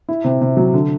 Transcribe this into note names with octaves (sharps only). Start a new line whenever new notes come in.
E4
C3
C3
F#3
D3